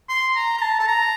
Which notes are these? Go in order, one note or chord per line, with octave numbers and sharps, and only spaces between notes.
C6
A#5
A#5
A5
A5
A#5